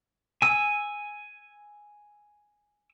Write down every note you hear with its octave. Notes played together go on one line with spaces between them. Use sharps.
G#5 E6